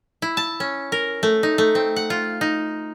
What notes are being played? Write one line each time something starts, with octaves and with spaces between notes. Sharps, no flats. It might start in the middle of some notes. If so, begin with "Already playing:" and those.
E4
A5
C#4
A#4
A3
D#4
A3
C4
F#5
F4
D#4